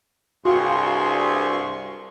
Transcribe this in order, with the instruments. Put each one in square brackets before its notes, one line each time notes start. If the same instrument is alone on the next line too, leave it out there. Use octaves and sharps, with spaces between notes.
[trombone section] C2 [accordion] G2 C6 C#6 [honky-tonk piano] F#4 F5 G5 [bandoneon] G#4